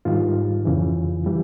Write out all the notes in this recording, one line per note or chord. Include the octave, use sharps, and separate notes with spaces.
G#2 D#3 G3 F4
F2 C#3 E3
E3 G3